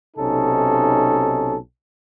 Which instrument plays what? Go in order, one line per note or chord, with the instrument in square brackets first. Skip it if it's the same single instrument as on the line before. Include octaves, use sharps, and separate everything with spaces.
[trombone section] B1 C3 C#4 D#4 A4